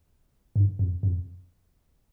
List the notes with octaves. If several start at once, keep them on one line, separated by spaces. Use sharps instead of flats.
G2
F2
F2